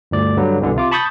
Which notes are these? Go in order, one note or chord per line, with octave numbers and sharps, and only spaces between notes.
G1 D2 D5
G2 D3 F#3 G3
C2 B2 D3 E3
C3 F4 D6
A5 B5 C#6 D#6 G6 A6